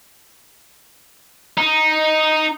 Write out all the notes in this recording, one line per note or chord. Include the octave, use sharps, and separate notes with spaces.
D#4